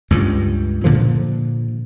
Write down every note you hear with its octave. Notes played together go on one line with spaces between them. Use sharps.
C#2 G2
A#2 D3 F3